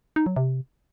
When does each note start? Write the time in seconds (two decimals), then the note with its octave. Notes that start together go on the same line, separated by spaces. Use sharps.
0.16 D#4
0.26 F#3
0.36 C3